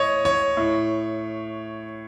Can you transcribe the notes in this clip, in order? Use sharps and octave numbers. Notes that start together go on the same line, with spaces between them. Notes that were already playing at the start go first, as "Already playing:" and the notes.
Already playing: A2 C#5 D#5
C#5
A2